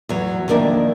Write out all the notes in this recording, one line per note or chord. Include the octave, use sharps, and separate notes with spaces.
E2 F#3
F2 D#3 A#3 D4 A#4 E5